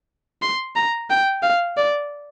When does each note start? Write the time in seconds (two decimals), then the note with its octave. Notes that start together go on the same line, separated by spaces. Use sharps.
0.42 C6
0.76 A#5
1.10 G5
1.43 F5
1.77 D5